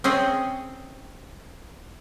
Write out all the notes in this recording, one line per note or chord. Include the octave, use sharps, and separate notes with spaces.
C4 C#4 G#4 D#5